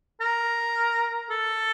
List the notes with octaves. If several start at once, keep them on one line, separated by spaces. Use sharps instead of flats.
A#4
A4